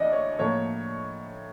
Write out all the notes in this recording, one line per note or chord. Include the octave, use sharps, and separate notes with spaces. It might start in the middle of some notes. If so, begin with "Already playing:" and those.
Already playing: D2 E3 D5 D#5
C#5
A2 F3 A#3 C#5